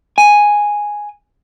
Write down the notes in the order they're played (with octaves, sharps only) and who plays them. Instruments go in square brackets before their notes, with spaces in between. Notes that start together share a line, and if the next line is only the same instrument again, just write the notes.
[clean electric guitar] G#5